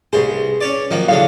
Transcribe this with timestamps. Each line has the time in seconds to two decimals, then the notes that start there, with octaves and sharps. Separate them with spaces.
0.13 C2 G#4 B4 C5
0.61 C#4 C#5 D5
0.91 D#3 F3 F#3 A#3
1.08 A2 C#3 D4 F5